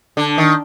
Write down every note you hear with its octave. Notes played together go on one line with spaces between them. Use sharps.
D3
D#3